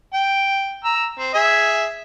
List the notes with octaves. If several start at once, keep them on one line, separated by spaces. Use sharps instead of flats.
G5
A#5 E6
C4
G#4 E5